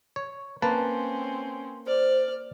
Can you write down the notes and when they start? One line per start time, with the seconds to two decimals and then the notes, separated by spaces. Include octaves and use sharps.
0.16 C#5
0.62 A#3 C4 C#4 B4 A5
1.87 C5 D5 F6